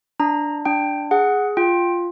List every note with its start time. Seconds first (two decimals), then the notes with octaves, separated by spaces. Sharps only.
0.20 D4 A#5
0.65 D4 G5
1.11 G#4 F#5
1.57 F4 G5